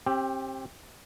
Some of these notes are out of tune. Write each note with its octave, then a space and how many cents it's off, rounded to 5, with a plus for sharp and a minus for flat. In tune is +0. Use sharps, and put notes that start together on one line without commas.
C4 +30 G4 +0